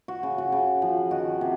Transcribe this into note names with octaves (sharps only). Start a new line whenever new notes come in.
F#4
C#3
F#4
C#3
F3
D#3 F#4
C3